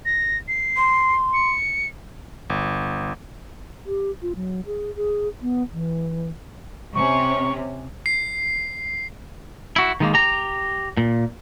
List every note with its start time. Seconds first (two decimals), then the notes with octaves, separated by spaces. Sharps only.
0.05 A#6
0.48 C7
0.77 C6
1.33 C#7
2.50 G1
3.86 G4
4.22 F4
4.36 F#3
4.66 G#4
4.96 G#4
5.42 B3
5.73 E3
6.95 C3 C#4 C#6
8.06 C7
9.76 E4 F#4
10.00 D#3 G#3 A#3
10.14 G4 A#5
10.97 A#2